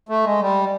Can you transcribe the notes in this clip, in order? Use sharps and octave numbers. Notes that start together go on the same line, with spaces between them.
A3
G#3
G3